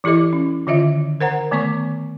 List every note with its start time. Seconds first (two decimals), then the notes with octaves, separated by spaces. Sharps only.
0.04 E3 E4 G4 A4 D#5 D6
0.33 C#4
0.67 D3 D#3 F4 D#5 E5
1.21 A#4 C5 F#5 A#5
1.51 D#3 A3 B3 C#6 D6